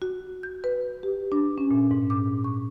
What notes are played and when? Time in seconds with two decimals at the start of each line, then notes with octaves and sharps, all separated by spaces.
0.02 F#4
0.43 G6
0.64 B4
1.03 G4
1.32 D4
1.58 C#4
1.71 A#2
1.91 G#2
2.10 D6
2.44 C#6